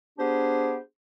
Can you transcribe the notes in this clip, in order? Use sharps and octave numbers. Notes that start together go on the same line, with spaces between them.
B3 D4 G4 G#4 C5